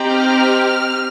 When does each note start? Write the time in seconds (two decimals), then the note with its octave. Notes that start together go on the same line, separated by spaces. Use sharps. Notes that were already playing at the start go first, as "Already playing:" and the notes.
Already playing: C4 D#4 G4
0.11 F6